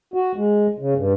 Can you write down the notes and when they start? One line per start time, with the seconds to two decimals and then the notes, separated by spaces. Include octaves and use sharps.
0.14 F#4
0.36 G#3
0.79 C#3
0.96 G2